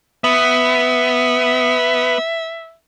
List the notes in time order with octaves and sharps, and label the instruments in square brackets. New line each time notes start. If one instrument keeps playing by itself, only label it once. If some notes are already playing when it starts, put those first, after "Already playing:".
[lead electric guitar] B3 [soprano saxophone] E5